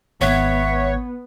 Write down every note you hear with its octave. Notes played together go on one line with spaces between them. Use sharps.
G#1 B3 C#5 E5 F#5 F#6